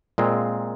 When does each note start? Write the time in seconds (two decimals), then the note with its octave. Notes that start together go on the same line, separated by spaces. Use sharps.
0.18 A#2 G#3 C4 F4